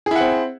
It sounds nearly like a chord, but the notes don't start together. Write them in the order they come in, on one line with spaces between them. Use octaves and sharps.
G#4 E4 F#5 C4